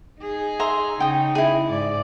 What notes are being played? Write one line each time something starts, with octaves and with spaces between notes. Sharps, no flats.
D#4 G#4
E5 A#5 C6
C#3 D#4 G5 D#6
E4 G#4
G#2 D5